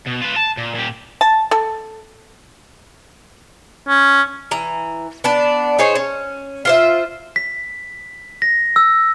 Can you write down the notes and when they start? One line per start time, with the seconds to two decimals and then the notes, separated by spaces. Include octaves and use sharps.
0.06 B2
0.21 F4 B4
0.36 A5
0.58 A#2
0.75 A#2 G4
1.21 A5
1.51 A4
3.87 C#4
4.51 E3 A#5
5.24 B3 D4 A5
5.79 D#4 G#4 C5 C#5
5.95 C#4
6.65 F4 C5 E5
7.36 B6
8.42 A#6
8.76 E6